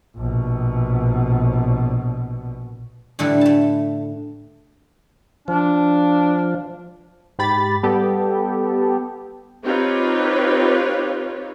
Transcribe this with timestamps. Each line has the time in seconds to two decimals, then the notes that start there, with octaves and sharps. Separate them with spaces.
0.17 A#1 B2
3.19 A2 D3 G3 E4 A4 B4
3.41 A3 A5
5.48 F3 D4
7.39 G#2 G4 B5 A6
7.83 G3 B3 G4 A4
9.64 C4 D#4 F4 G4 B4 C#5